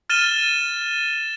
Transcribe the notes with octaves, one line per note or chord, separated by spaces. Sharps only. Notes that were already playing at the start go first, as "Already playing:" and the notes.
F6 A6 D#7 E7 G7